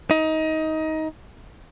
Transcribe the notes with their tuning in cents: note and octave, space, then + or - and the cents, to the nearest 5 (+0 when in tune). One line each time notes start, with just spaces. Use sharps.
D#4 +20